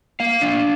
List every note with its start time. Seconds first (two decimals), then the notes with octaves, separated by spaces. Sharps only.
0.20 A#3 F5
0.41 D4